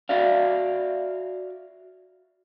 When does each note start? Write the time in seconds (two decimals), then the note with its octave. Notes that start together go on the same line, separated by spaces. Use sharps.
0.09 F#4 D5 E5 F5